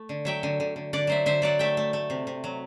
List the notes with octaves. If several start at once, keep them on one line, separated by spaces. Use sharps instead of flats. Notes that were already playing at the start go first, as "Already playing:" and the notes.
Already playing: A3
D3
F#3 E5 G5
D3
D3
D3
D3 D5 F#5
F#3 C5 E5
D3 C5 E5
F#3 D5 F#5
A3 E5 G5
A3
A3
C3
C3
F#3